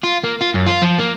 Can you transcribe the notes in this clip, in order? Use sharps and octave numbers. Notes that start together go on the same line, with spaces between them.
F4
A#3
F4
F#2
F4
F3
A#3